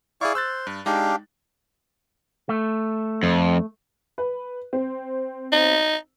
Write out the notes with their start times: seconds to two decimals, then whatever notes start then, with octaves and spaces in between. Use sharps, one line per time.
0.21 E4 G#4 D5 F5 C#6
0.35 C5 E6 F#6 A6
0.67 G2
0.86 G#3 D4 D#4 G4 F5
2.49 A3
3.23 F2
4.18 B4
4.73 C4
5.52 D#4